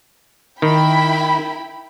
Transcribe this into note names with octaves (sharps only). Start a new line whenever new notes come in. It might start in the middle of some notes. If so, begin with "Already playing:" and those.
D#3 E4 G5 B5